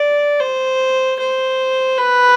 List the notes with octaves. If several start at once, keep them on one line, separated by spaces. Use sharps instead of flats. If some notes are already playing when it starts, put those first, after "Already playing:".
Already playing: D5
C5
C5
B4